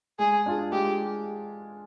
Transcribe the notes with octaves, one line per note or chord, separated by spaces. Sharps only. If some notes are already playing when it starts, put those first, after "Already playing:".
G#3 G#4
D4 F4 G#4
G#3 G4